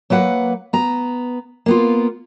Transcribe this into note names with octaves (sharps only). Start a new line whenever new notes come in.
F#3 A#3 B4 F#5
B3 A#5
A#3 B3 F4